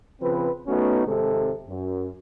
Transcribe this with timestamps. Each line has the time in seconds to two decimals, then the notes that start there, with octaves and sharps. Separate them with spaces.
0.22 C#3 F3 C4 B4
0.67 A3 B3 C#4 D#4 F#4
1.06 G#1 C3 G#3 A4
1.68 F#2